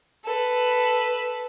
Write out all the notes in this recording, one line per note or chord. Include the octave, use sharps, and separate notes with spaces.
A4 B4